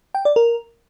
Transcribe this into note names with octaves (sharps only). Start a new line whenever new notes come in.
G5
D5
A#4